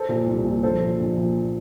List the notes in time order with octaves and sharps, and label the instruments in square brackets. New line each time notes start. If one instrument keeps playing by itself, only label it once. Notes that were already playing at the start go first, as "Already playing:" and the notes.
Already playing: [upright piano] A4 C5
A#2
C2
A#2
A#1 A4 C5
A#2
A#1
A#2